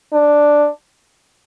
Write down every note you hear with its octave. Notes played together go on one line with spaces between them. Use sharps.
D4